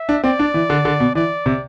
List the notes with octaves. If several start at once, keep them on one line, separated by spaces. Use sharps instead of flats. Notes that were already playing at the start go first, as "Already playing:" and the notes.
Already playing: E5
D4
C4 D5
D4
E3
D3
D3
B2
E3 D5
C3